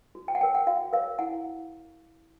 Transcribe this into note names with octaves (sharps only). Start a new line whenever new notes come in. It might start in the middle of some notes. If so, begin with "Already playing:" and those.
F#4
G5
F#5
A#4 C#5 G5
F#5
F#4 F5
A#4 C#5 F5
E4 F#5